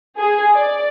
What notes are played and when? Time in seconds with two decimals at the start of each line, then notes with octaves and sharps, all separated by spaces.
0.18 G#4
0.55 D5